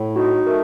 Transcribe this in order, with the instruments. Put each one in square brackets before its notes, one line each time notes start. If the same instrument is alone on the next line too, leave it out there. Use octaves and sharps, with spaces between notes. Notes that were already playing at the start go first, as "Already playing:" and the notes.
Already playing: [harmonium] A2
[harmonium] D#4 [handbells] F#4
[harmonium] A3 [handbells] A#4